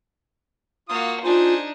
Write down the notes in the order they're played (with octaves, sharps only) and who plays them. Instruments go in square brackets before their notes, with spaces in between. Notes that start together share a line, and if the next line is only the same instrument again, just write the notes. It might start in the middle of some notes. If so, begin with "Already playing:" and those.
[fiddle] A#3 F#4 [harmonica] F4 D#6
[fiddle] D4 D#4 [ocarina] F4 [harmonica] G#4 C5